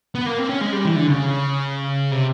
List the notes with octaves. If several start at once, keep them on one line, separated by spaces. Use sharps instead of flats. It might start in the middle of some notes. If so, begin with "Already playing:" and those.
B3
A#3
C4
C#4
G#3
G3
E3
D3
C#3
C3